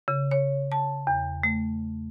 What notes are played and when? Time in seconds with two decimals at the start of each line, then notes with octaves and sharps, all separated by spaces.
0.08 C#3
0.31 C#5
0.72 A5
1.07 E2
1.43 A3